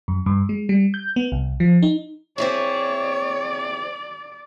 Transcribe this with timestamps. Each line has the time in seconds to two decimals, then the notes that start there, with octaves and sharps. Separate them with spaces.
0.08 F#2
0.26 G2
0.49 G#3
0.69 G3
0.94 G6
1.16 B3
1.32 C2
1.60 F3
1.82 D#4
2.38 C4 E4 G#4 C#5 D5